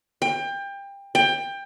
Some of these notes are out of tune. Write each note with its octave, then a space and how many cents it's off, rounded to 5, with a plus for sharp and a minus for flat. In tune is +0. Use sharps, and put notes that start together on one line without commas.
G5 +25
G5 +20